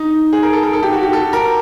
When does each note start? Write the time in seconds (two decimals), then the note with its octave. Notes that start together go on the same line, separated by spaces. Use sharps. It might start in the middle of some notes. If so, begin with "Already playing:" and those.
Already playing: D#4
0.33 G#4
0.43 A#4
0.53 A4
0.63 A#4
0.73 A4
0.83 G4
0.93 F#4
1.03 G4
1.13 A4
1.33 A#4